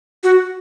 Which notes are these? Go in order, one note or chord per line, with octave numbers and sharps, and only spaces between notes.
F#4